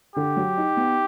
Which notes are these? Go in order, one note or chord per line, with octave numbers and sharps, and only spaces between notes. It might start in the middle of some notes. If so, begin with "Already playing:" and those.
D3 G4
F#3
D#4
B3